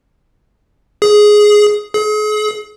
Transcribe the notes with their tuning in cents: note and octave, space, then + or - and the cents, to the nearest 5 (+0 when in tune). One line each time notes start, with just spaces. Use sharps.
G#4 +5
G#4 +40